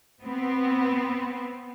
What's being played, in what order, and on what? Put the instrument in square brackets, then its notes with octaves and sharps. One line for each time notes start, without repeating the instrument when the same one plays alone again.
[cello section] B3 C4